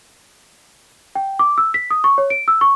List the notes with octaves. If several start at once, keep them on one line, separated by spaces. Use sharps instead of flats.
G5
D6
E6
B6
D#6
C#6
C#5
D7
E6
C#6